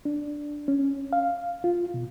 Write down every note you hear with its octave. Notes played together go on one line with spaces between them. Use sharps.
D4
C#4
F5
F4
B2